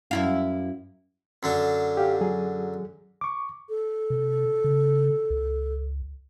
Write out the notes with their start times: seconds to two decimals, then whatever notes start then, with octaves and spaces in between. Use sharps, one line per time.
0.11 F#2 E4 F5
1.43 F#2 D3 D4
1.97 G4 F5
2.21 F#3 G#4
3.21 C#6 D6
3.69 A4
4.10 C3
4.64 C#3
5.30 C#2